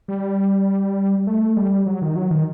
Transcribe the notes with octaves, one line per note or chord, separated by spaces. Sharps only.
G3
A3
G3
F#3
D#3
F#3
D#3